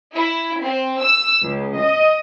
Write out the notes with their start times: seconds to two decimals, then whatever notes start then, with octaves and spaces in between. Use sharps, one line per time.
0.16 E4
0.61 C4
1.02 E6
1.44 C#2
1.80 D#5